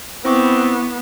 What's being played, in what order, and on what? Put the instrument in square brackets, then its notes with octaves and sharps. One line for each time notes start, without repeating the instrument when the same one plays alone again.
[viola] B3 [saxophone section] C4 [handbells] E4 C#6 D6